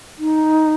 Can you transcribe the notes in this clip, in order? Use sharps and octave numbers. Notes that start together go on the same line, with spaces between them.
D#4